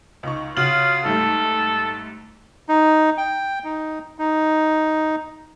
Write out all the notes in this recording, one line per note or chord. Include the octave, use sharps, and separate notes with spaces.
C#2 D#4 C#6
C#3 F4 F#4 F#7
G#2 G3 A3 A4
D#4
G5
D#4
D#4